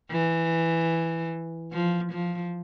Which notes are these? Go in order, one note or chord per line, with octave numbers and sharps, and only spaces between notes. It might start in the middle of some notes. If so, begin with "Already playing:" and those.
E3
F3
F3